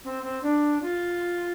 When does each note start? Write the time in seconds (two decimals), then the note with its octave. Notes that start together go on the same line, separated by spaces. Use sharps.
0.04 C4
0.23 C4
0.43 D4
0.82 F4